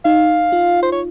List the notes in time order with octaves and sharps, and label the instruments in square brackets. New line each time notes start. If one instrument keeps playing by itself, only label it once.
[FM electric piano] D#4 [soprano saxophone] F5
[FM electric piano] F4
[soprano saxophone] C5
C#5